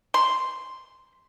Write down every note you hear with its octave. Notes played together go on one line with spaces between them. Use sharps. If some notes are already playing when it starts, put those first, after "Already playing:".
C6